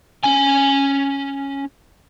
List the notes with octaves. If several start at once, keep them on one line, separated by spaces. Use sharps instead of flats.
C#4 G#5